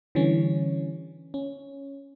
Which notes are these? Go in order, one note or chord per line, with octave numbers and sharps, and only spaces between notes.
D3 E3 G3 C#4
C#4